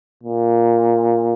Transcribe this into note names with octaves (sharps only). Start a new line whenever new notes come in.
A#2